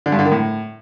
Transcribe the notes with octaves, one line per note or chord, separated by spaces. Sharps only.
D3
G2
D3
D#3
A2